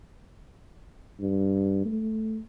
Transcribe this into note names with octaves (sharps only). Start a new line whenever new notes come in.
G2
A3